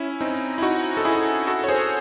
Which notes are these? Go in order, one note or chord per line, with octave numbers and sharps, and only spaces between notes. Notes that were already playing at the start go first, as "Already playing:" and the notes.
Already playing: C#4 E4
C4 D#4
E4
D#4 F#4
A4
E4 G#4
F#4 A4
C#5
G#4 C5